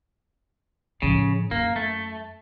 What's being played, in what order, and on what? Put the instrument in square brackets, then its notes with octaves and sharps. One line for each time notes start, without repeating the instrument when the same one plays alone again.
[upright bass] A2 F3 [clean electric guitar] C#3
[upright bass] F#2 [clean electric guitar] A#3
[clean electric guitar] A3